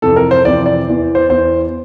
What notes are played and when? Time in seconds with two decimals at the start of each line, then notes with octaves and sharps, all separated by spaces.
0.02 F2 C3 E3 A4
0.16 A#4
0.31 C5
0.45 F2 C3 E3 D5
0.66 D5
0.88 E2 E3
1.15 C5
1.29 E2 E3 C5